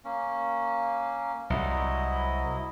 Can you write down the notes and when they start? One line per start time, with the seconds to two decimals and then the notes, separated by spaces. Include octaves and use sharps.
0.05 A#3 C#4
1.50 C2 F#3 E4 D#5